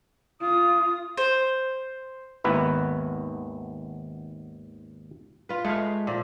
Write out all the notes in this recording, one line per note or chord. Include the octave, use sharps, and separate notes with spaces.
F4 D#6
C5
G#1 D#2 B3 E4 B4
F4 B4
G#3 A3 F5
A#2 F3